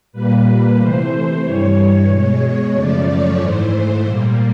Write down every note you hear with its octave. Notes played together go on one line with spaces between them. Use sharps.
A#2 G3 A#3 B4
C3 E3 A3 C5
G2 E3 G3 C#5
B2 G#3
F#2 C#3 F3 A3 D5
C#5
G#2 E3 A3 C5
A#2 G3 A#3